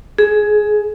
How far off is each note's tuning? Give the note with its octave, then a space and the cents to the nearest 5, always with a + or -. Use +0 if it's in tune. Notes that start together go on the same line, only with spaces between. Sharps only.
G#4 +15